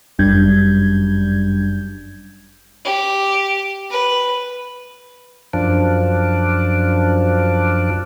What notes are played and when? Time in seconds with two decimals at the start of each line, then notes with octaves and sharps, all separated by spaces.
0.19 G1 F#2 G3 D4 G6 G#6
2.85 G4
3.90 B4
5.53 F#2 F3 D4